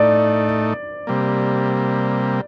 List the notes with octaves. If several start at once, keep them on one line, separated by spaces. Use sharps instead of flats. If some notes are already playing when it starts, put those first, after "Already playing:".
Already playing: A2 A3 D#4 D5
C3 G3 A#3